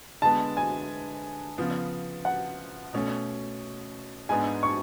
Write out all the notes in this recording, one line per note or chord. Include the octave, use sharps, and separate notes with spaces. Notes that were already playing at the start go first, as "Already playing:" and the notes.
D3 G#3 B3 A5
G#5
C#3 F3 B3
F#5
B2 A3 C#4
G#2 G#3 B3 D4 G#5
C#6